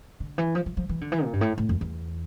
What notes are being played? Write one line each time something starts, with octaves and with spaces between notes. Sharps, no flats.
D3
E3
F3
F3
F3
E3
D3
E3
A#2
G2
A2
A2
F2
E2